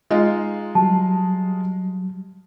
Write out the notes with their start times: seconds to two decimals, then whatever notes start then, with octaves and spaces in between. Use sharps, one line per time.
0.10 G#3 D#4 F4
0.75 F#3 G3 A5